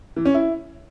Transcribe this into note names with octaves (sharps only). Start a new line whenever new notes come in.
E3
C#4
E4